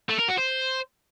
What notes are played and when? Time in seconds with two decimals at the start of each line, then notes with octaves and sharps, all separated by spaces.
0.10 A3
0.19 A#4
0.29 F#4
0.38 C5